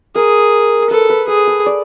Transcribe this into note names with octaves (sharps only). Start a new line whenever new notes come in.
G#4 A#4
A4 B4
B4
G#4 A4
A4
D5